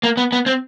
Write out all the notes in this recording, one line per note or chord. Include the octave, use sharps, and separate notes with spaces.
A#3
B3
B3
C4